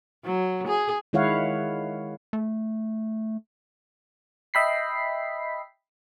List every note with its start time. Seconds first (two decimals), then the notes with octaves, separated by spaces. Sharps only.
0.25 F#3
0.68 G#4
1.13 D#3 G#3 E4 C#5 F5 F#5
2.33 A3
4.54 D#5 E5 G5 B5 B6 C7